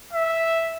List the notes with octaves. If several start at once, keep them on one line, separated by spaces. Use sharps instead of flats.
E5